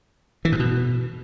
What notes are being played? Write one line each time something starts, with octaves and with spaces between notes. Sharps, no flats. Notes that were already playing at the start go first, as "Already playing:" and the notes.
E3
G#2
B2